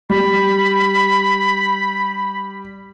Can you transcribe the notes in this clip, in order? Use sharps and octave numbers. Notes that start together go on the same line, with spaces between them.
G3 B5